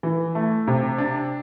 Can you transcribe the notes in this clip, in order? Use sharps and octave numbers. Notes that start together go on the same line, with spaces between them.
E3
A3
C3
D4